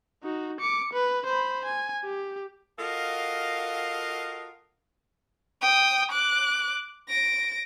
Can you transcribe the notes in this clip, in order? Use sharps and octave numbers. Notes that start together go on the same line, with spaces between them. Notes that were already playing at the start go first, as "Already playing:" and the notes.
D#4 F#4
D6 C#7
B4
C5 B5
G#5
G4
F4 F#4 A4 A#4 D#5 F5
G5 D#6
D6 F#6
A#6 D7